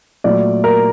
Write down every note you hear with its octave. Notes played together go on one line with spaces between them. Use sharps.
A#2 F#3 A3 D5
A#4